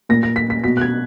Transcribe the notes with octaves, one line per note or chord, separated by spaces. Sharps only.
A#2 A#6
A#6
B6
B6
B2 B6
F#6
G#6